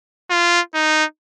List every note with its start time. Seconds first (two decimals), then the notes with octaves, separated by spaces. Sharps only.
0.30 F4
0.74 D#4